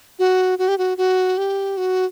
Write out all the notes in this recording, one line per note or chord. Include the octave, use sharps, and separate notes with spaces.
F#4
F#4
G4
F#4
F#4
G4
F#4